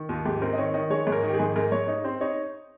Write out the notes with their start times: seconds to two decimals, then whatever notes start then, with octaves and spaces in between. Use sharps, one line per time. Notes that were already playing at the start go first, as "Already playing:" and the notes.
Already playing: D#3
0.09 D#2 F4
0.25 G#2 G4
0.42 C4 A#4
0.53 D#5
0.58 D#3 C#5
0.74 D#3 D#5
0.90 G#3 C#5
1.07 G#2
1.12 A#4
1.23 D#3
1.30 G4
1.34 G#4
1.39 G#2
1.56 G#2 A#4
1.72 G#2 C#5
1.88 D#4
2.04 C4 C5
2.21 D#4 C#5